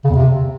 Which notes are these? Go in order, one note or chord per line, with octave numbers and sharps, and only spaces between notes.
C#3
E2
C3